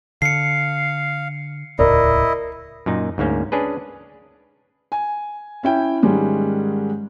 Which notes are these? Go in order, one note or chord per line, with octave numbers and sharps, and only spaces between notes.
D3 F5 C7 C#7
D#1 C#2 A2 E4 A#4 D5 D#5
F#2 A#2 D#4
D2 G#2 A#3 C#4
C#4 D4 G#4 B4
G#5
C#4 E4 G5
G#2 D#3 G3 G#3 C#4